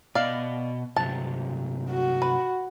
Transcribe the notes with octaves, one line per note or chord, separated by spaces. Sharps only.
B2 D5 D#5 F5
G2 C3 F#3 A5
F#4
B4